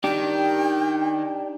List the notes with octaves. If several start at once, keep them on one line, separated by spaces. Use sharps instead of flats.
D#3 D4 G4 G5